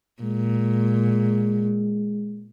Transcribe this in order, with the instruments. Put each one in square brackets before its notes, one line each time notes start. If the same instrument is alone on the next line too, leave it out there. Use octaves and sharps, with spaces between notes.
[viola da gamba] A#2 [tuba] G#3